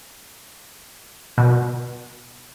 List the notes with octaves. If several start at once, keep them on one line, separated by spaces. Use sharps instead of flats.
B2